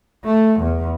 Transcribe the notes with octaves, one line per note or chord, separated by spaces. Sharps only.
A3
E2